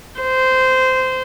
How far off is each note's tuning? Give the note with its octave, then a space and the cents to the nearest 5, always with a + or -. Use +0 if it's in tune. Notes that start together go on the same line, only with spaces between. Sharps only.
C5 -15